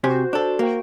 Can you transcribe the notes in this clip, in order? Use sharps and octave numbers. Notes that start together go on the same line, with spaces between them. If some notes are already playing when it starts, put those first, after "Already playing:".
C3 F#4 G4 C5 G#5
D4 A4
A#3 F#4 G5